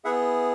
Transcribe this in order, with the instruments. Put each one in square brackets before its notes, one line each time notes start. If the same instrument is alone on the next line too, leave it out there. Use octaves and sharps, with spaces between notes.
[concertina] B3 E4 G#4 E5 F#5